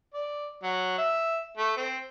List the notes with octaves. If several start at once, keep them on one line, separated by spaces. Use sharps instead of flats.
D5
F#3
E5
A3
C4